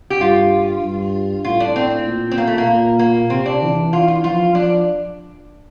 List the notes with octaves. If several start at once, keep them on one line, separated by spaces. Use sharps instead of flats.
G4
G2 F4
G2
A2 F4
D4
C4
A#2
C4
A#3
A3
A#3
A#2
A#3
C3 C4
D4
E3
F4
F4
F3 F4
F3 D4